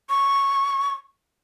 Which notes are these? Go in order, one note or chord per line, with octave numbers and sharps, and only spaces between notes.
C#6